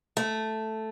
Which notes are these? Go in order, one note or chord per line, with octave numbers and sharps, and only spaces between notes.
A3